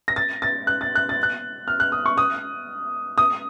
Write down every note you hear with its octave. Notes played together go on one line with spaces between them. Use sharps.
A#6
A6
A6
F#6
A6
F#6
A6
F#6
F6
F#6
D#6
C#6
D#6
D#6